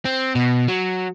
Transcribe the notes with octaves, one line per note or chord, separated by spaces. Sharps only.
C4
B2
F#3